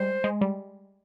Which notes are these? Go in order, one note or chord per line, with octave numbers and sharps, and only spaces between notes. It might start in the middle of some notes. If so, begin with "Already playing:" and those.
Already playing: G3 G#3 C5
G#3
G3